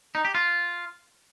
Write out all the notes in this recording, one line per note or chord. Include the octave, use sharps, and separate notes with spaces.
D#4
G4
F4